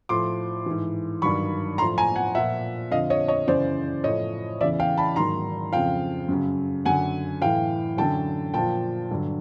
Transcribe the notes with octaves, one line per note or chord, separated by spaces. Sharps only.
A2 F3 C6 D6
G#2 E3
G2 D#3 F#3 B5 C#6
A2 F3 A#5 C6
G#5 A#5
F#5 G#5
A#2 F3 E5 F#5
F2 D3 F3 D#5 F5
C#5 D#5
C#5 D#5
F#2 C#3 E3 C5 D5
A2 F3 C#5 D#5
E2 C#3 E3 D5 E5
F5 G5
A5 B5
G#2 D#3 F#3 A#5 C6
F2 C#3 F3 F5 G5
F#2 C#3 F#3
F#2 D3 F#3 F#5 G#5
A2 E3 F5 G5
F#2 D3 F#3 G5 A5
A#2 F3 G5 A5
G2 D3 F#3